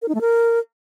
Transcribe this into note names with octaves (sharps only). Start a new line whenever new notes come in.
A#4
D#4
A3
A#4